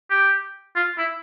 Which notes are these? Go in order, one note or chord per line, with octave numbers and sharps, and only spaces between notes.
G4
F4
E4